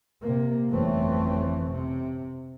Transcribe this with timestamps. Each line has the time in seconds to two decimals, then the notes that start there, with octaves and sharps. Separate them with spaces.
0.22 C3 A#3
0.69 G1 F2 E3 A3 C4 C#4
1.70 C3